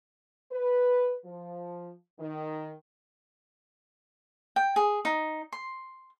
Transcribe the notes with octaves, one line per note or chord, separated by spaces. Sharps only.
B4
F3
D#3
G5
G#4
D#4
C6